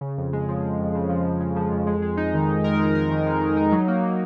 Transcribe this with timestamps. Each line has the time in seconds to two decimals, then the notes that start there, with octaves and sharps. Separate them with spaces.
0.01 C#3
0.17 F2
0.33 G#3
0.48 F3
0.63 F3
0.79 F2
0.95 C#3
1.09 F3
1.25 F3
1.40 C#3
1.56 F3
1.72 F2
1.87 G#3
2.02 G#3
2.17 D#4
2.34 D#3
2.49 D#3
2.64 A#4
2.79 G#3
2.95 A#4
3.11 D#3
3.27 G#3
3.41 D#3
3.57 D#4
3.72 F#3
3.88 A#3
4.03 F#3